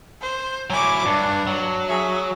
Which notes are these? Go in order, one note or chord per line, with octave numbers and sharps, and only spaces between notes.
C5
F#3 E4 G#5 D6
G2 D4
F#3
G#4 E5